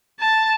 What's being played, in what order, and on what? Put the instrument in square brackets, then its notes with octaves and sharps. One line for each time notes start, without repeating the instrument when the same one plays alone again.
[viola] A5